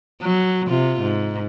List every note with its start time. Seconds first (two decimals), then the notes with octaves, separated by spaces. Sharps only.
0.22 F#3
0.68 C3 F4
1.01 G#2